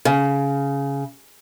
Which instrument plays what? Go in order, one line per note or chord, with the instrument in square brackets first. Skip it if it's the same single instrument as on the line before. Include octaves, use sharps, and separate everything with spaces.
[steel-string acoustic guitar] C#3